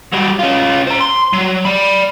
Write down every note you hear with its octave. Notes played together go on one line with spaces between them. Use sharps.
F#3 G3
C#4 F4
C5 A#5
C6
F#3
D5 B5